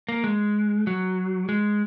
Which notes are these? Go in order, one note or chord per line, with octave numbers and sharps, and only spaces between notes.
A#3
G#3
F#3
G#3